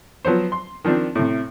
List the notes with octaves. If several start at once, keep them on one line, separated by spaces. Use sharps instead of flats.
F3 F#3 B3 C5
C6
D#3 F3 C4 D4
A2 C3